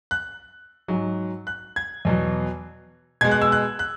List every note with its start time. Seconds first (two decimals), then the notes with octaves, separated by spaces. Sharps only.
0.11 F#6
0.88 G#2 F#3
1.47 F#6
1.76 G#6
2.05 E2 B2 F#3
3.21 B2 G#3 G#6
3.31 F#6
3.42 E6
3.52 F#6
3.79 F#6